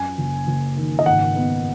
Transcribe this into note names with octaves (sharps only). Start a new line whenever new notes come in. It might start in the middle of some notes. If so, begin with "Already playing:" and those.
Already playing: F#2 G#5
F#1
F#1
D#3
D#5
G#1 F#5
B3